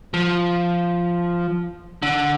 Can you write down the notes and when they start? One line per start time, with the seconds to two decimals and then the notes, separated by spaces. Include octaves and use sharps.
0.14 F3
2.02 D3